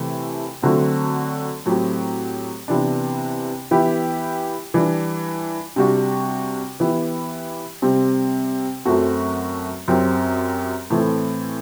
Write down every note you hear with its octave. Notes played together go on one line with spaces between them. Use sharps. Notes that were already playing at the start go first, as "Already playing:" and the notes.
Already playing: C3 E3 A3 C4
D3 F#3 A3 C4 F#4
A2 F#3 C4 G4
C3 E3 B3 D4
E3 B3 E4 G4
E3 G3 D4
C3 G3 D4 F#4
E3 B3 E4 G4
C3 G3 C4
F#2 F#3 A3 C4 F#4
F#2 F#3 C4 G4
A2 E3 A3 C4